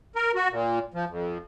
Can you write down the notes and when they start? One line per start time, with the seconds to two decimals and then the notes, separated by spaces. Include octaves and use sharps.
0.15 A#4
0.35 F#4
0.51 A#2
0.94 F3
1.08 F2